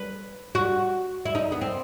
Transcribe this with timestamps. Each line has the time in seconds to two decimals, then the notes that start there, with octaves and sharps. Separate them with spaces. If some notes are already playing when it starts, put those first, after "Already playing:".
Already playing: B4
0.55 F#4
1.25 E4
1.35 D#4
1.52 B3
1.61 C4